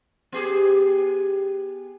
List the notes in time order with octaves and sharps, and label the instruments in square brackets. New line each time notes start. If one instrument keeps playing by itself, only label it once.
[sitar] B3 G4 G#4